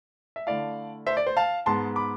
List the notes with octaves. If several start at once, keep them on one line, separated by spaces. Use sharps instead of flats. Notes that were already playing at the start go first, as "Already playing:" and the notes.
E5
D3 A3 E4 D5 F5
C5 E5
D5
C5
F5 A5
G#2 G#3 B3 A5 C6
B5 D6